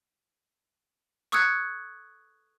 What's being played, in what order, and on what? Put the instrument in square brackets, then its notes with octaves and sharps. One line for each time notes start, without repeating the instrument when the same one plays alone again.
[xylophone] C#6 D#6 E6 F#6 G#6 C#7